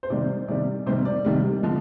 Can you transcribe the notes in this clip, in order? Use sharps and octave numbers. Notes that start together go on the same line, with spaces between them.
C5
C3 D#3 G3 D5
C3 D#3 G3 D5
C3 D#3 G3 C5
D5
C3 D#3 G3
D3 F3 G#3